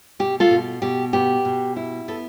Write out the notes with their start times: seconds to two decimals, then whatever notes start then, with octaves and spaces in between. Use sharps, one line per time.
0.19 B2 G4
0.40 F4 A4
0.51 B2
0.82 B2 G4
1.13 B3 G4
1.45 B2
1.76 E4
2.08 B3 A4